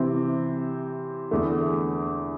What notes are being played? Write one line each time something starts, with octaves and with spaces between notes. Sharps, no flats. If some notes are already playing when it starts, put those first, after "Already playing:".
Already playing: C3 E3 C4
E2 D3 A3